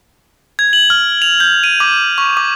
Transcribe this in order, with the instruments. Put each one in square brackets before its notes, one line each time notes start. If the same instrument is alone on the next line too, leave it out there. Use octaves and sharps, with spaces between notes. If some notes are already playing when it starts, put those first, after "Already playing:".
[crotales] G#6
F#7
F6
F7
G6
D#7
D6
C#6
D6